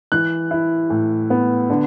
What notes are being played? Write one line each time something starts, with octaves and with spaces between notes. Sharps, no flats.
E3 F#6
E4
A2
B3
D3